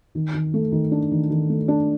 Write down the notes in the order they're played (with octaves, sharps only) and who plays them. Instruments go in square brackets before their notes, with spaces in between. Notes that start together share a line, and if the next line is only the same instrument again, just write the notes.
[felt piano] D#3
D#3
A3
D#3
D4
D#3
D#3
A3
D4